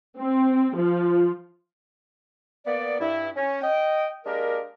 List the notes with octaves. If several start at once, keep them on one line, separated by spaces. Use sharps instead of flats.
C4
F3
A#3 B3 D5
G2 E4
C#4
D#5 G5
G#3 A#3 D4 G4 A#4